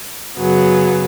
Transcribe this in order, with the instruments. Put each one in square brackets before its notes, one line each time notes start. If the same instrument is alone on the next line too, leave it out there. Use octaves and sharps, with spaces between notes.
[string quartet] F#2 C#3 F#3 B3 G#4